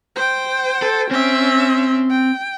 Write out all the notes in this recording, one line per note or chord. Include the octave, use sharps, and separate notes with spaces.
C5 G5
A4
C4 C#4 E5
G5